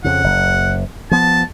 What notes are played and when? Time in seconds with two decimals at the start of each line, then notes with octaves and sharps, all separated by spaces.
0.04 F2 C#3 F#5
0.24 F#1
1.11 F3 B3 A5